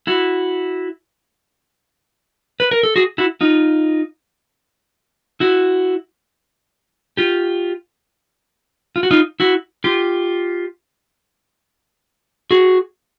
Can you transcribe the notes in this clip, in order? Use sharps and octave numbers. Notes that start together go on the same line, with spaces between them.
E4 F#4
B4
A#4
A4
F#4 G#4
E4 F#4
D#4 F4
E4 F#4
F4 G4
F4
F#4
D#4 F4
E4 F#4
F4 G4
F#4 G#4